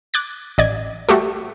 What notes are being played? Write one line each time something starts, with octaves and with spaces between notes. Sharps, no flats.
D6 F#6 G#6 A6
A1 D5 D#5 G#6
G3 A3 F#4 G4 A4